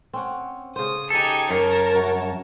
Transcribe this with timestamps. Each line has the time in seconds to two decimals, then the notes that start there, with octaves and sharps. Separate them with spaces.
0.13 C4 C#4 F#5
0.76 C#3 C5 D#6
1.10 D#4 G4 A4 G#5
1.50 F#2 A#4 C#5 A5
1.95 F#4